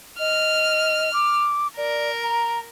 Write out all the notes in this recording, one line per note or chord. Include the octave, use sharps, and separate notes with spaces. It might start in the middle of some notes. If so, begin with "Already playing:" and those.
D#5 F6
D6
A#4 D5
A#5